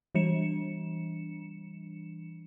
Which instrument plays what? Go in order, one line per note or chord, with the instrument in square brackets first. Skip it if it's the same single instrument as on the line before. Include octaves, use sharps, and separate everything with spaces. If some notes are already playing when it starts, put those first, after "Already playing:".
[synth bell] E3 G3 D4 C#7 E7